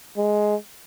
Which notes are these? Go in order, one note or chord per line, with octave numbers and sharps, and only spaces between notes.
G#3